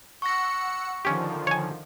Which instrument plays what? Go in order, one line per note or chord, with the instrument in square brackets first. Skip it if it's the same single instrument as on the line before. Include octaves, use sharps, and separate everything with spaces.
[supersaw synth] F#5 E6 C#7 [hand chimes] C#6 A#6
[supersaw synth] D3 D#3 F3 [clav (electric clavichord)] C#4 G4
[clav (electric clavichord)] C#5 G#5